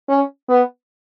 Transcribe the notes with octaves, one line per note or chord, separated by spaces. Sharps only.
C#4
B3